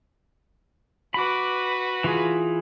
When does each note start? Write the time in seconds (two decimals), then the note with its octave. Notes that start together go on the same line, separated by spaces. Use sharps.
1.14 F#4 B4 B5 D6
2.04 E3 F4 G#4